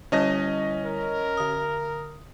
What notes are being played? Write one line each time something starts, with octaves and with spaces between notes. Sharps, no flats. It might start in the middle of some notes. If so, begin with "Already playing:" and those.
D3 G3 C#4 E4 D#5 A#6
A#4
D3 D#6